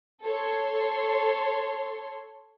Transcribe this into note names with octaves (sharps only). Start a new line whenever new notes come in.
A4 C#5 C6